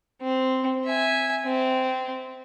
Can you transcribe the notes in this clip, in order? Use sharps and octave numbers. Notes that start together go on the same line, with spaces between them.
C4
E5 G#5
C4